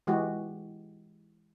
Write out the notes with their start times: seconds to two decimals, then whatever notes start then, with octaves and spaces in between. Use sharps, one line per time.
0.07 E3 G#3 F#4 G4